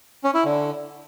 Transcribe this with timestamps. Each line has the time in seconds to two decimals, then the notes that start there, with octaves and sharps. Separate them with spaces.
0.24 C#4
0.34 E4
0.45 D3